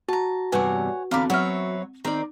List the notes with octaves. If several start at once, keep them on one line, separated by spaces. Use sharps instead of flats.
F#4 A5 A#5
E2 G2 C3 B4 C#5 F#5 G#5
E2 D3 C4 F5 A#5 B5 D6
F#3 C4 B4 C#5 E5 F#5 F6
D#3 C4 A#4 D5